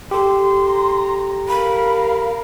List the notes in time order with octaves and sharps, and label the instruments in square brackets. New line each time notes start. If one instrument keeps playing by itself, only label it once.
[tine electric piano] G4 A4 [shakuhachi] C6
[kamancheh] A#5
[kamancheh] A#4 F5 [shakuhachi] B5